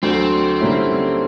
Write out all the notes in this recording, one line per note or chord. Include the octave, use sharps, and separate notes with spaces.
D2 D3 F#3 C4
D3 G3 A#3 C#4 E4